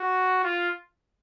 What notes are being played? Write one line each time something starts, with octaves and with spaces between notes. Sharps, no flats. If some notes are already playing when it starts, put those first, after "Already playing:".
Already playing: F#4
F4